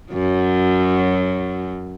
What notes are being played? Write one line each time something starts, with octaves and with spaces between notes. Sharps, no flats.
F#2 F#3